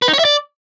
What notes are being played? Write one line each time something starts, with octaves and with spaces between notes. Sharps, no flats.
B4
D#4
C#5
E5
D5